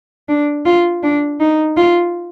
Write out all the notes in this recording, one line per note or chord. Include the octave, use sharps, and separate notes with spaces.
D4
F4
D4
D#4
F4